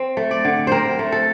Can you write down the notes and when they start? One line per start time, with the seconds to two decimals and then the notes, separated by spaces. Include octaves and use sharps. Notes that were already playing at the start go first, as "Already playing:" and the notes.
Already playing: C4
0.17 A3
0.31 D5
0.45 D3
0.67 C4 A#4 C5
0.99 A3
1.12 A4